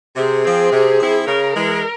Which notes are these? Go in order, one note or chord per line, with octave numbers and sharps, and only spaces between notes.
C3 G#4
F3 C4
C3
F3 C4 E4
C#3 A#4
E3 G#3